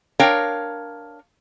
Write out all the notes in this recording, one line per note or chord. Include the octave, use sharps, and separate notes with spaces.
D4 A#4 C#5 F5 G5